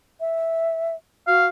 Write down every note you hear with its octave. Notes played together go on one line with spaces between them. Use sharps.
E5
F#4 F5